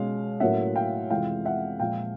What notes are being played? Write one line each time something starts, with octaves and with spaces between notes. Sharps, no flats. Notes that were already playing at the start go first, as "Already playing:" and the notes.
Already playing: B2 G#3 C#4 F5
A2 F#3 A#3 C#4 E5 F#5
F5 G5
F2 C3 E3 G#3 F5 G5
E5 F#5
A#2 F3 G#3 F5 G5